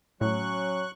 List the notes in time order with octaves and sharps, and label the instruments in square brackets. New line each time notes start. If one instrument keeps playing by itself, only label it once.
[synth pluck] A2 [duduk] F#3 [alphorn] C#4 [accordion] C#6 F#6